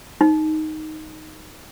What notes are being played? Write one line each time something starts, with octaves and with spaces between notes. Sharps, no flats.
D#4